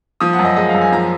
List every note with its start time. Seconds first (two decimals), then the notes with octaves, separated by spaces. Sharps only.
0.20 F3 D#6
0.33 F#5
0.39 F#2
0.45 D#5
0.56 G#3 D#5
0.69 F5
0.74 F#2
0.81 G#5
0.92 F3 A#5